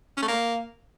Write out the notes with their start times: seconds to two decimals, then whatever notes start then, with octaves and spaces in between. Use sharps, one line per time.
0.17 C#4
0.22 A3
0.28 A#3